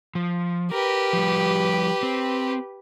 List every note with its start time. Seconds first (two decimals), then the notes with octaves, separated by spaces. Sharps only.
0.15 F3
0.71 G4 A#4 B4
1.13 F3 G3
2.03 C4